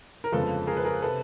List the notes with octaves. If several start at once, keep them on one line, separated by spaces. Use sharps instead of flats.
A#4
G1 F2 C#3 F3 G#3 A4 B4
G#4 A#4
B4
G#4 A#4
C3 A4 B4